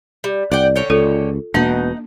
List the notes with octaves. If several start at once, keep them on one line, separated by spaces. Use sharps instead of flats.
G3
C2 D5 F#5 G5
D3 C#5 G5
C#2 F4 A4
E1 B2 A#3 D4 D#4 F#5